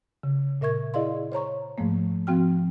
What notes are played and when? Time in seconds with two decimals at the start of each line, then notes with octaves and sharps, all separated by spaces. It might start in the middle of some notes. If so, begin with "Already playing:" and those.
0.23 C#3
0.61 A#2 A#4 E5 C#6 G#6
0.94 E4 G#4 D5 D#5 F5 C6
1.32 C5 C#5 A#5 C#6
1.78 G#2 F3 A3 A#3
2.27 F3 C4 F#4 G5 F6